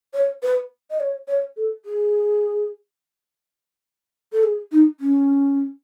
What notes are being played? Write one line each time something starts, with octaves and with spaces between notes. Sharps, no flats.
C#5
B4
D#5
C#5
C#5
A4
G#4
A4
G#4
D#4
C#4